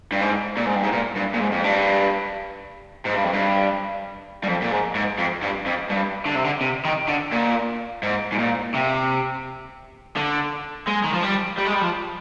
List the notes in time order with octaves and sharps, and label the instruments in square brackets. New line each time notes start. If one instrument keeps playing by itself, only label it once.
[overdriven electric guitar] G2
G#2
A#2
G#2
G2
G#2
A#2
G2
A#2
G#2
F2
G2
G#2
G2
F2
G2
G2
F2
A#2
G#2
G#2
F2
G2
F2
G2
D3
C3
D3
C3
D#3
D3
A#2
G#2
G#2
A#2
C3
D3
G#3
D#3
F3
G3
G3
G#3
G3
F3